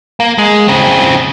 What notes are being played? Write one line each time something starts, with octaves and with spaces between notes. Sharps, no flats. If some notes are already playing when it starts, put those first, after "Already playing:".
A#3
G#3
C#3 C4